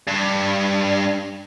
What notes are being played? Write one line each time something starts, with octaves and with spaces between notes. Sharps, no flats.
G2